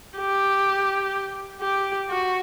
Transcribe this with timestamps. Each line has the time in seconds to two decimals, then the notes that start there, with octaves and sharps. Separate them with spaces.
0.18 G4
1.61 G4
2.10 F#4